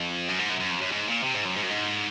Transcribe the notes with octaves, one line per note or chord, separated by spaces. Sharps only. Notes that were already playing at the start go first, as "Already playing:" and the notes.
Already playing: F2
F#2
G#2
F#2
F#2
F2
F#2
G#2
A#2
C3
G#2
F#2
G#2
F#2
G#2